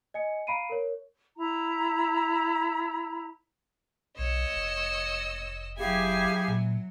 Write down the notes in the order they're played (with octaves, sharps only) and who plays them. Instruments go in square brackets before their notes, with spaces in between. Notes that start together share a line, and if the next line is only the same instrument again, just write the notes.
[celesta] D#5 G#5 C#7
F5 A#5 B5 C7 D7 D#7
A#4 C#5
[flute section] E4 A#5
[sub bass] B1 [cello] C#5 [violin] D#5 E6
[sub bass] F1
[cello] F#3 [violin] E4 G#5 [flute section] G4 G#4 F5
[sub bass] A#2